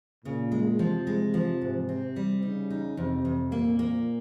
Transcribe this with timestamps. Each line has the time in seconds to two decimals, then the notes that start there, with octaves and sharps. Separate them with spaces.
0.25 A#2 C#3
0.52 G#3
0.79 C3 F3
1.07 G#3
1.34 F3
1.61 G#2
1.89 C4
2.16 G3
2.42 C#3 D#4
2.70 D#4
2.97 F2 C3
3.25 F2
3.52 A#2 A#3
3.79 A#3